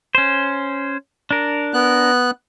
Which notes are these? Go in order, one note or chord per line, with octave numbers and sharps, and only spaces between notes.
C#4 C5
D4 A#4
B3 F#6